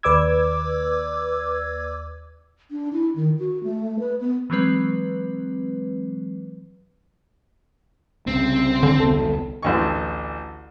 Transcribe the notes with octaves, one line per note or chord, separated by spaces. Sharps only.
D#2 B4 D5 D6 E6 G#6
D4
E4
D#3
F#4
A3
B4
B3
E3 F#3 G#3 C4 B4
C2 C#3 C4
D3
E1 C2 B3 A4
A1 D2 C#6